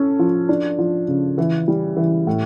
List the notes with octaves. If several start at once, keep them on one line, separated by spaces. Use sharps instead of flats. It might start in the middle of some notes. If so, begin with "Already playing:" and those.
Already playing: C#4 A4
F3
D4
F3
C#3
E3
G3
E3
A2